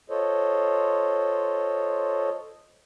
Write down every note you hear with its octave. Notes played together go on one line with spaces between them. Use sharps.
F4 A4 C5 C#5 D#5